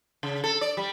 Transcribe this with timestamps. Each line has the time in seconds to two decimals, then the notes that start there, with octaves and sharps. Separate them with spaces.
0.23 C#3
0.44 A4
0.61 D5
0.77 G3